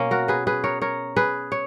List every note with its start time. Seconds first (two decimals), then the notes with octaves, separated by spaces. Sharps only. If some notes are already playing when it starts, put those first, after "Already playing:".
Already playing: B2 A#3 C#4
0.11 F#4 A#4
0.28 G#4 B4
0.47 G#4 B4
0.64 A#4 C#5
0.82 A#4 C#5
1.16 G#4 B4
1.52 C#5